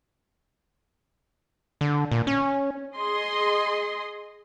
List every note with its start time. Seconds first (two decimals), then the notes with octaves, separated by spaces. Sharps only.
1.81 D3
2.12 A#2
2.27 C#4
2.97 G#4 D#5 C6